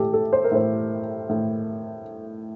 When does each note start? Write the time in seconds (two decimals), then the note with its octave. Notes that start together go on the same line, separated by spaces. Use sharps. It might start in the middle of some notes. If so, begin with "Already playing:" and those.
Already playing: A2 G4 A4
0.14 A4
0.33 C5
0.44 A#4
0.52 A2 C5
1.29 A2